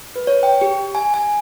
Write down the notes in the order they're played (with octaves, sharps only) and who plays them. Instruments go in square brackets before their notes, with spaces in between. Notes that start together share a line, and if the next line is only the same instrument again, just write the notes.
[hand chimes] B4
C#5
G5
G4
G#5
G#5